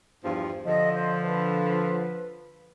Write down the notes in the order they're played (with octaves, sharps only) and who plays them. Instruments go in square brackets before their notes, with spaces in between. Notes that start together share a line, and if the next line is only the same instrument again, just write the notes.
[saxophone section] E2 G2 F3
[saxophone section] D3 F3 [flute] D#5
[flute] C5
B4